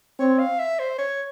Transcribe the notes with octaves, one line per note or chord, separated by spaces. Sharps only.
C4 C#5
F5
E5
C5
C#5